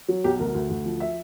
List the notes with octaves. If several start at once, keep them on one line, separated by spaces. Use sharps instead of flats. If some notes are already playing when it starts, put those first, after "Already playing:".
F#3
B1 G4
D2 A#4
D2
D2
F3
E5